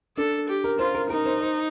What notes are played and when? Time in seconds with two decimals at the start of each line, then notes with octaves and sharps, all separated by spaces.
0.17 D4 A4
0.48 G4
0.64 A#4
0.79 F4 C5
0.94 A#4
1.10 D#4 A#4
1.25 C5
1.40 C5